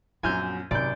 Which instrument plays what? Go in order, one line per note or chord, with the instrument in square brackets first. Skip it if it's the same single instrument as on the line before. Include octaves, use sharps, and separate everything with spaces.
[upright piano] A#1 F#2 F#3 [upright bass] B3 [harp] G#5 F6 G6
[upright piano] G#1 F#2 D7 [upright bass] C3 [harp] D5 G6